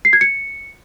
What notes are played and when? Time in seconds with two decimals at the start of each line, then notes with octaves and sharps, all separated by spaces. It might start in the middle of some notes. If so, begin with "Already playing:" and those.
0.05 C7
0.13 G#6
0.21 C#7